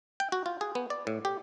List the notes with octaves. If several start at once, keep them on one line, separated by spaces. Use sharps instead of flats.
G5
F#4
F4
G#4
B3
D5
A2
G4